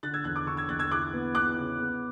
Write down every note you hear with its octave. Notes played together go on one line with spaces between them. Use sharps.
D3 F#6 A6
E6 G#6
E2 F#6 A6
D6 F#6
D3 C#6 E6
E6 G#6
E2 F#6 A6
E6 G#6
E4 D6 F#6
B3
B3 D6 F#6
C#3
B3